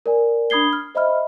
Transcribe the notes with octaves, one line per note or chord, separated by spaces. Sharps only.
A#4 D5 G#5
D4 B5 D#6 G#6 C7 G7
F6
C5 D#5 E5 B5 F6